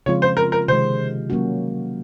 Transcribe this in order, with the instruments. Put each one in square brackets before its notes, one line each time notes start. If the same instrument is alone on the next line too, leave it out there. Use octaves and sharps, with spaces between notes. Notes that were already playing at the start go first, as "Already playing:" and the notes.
[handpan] C#3 F3 G#3 C4 F4 [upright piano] C#5
[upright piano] C5
A#4
A#4
[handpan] C3 D#3 G#3 [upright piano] C5
[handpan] F#3 A#3 C#4 F#4